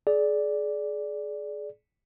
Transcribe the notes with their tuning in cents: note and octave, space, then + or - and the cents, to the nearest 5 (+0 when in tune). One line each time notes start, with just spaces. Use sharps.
G#4 +30 D5 -5